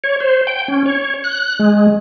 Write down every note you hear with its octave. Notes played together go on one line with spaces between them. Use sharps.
C#5
C5
G5
C#4
C#5
F#6
G#3